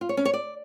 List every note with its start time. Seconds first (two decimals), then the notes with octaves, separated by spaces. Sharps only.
0.01 F4
0.09 C#5
0.17 C#4
0.25 C#5
0.33 D5